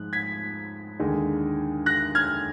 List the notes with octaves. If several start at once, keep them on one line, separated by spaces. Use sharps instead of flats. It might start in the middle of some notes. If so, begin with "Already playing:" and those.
Already playing: G#2 F3 F#6
G#6 B6
D#2 D3 G#3 D#4
F#6 A#6
F6 G#6